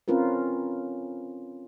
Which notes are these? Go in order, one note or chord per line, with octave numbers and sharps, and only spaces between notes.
C4 C#4 F4 A#4 B4